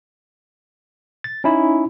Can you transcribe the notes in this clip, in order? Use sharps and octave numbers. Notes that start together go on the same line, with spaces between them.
A6
C#4 D#4 E4